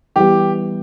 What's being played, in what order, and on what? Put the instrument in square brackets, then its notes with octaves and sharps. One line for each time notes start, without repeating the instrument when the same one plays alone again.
[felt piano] E3 G3 B3 [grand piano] G4